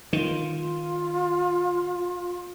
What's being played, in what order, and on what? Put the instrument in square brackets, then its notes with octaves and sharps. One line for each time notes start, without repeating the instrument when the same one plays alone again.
[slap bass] D#3 [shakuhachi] F4